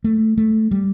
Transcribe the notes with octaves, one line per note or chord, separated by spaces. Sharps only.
A3
A3
G3